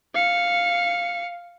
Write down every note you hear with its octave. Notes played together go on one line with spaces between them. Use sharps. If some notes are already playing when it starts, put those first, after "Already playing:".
F5 C#7